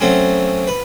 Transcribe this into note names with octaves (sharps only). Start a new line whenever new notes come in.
F#3 A3 C4 C#4
B4